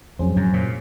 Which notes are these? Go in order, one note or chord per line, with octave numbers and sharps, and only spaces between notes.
F2 F#3 C#4 G#4 C5
F#2
A#2